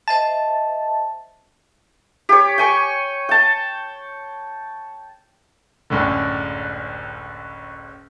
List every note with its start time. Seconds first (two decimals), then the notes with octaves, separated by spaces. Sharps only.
0.08 C5 D#5 E5 A5
2.29 G4 C#5
2.58 G5 G#5 C#6
3.29 G5 A5
5.90 F#1 C#2 A2 D3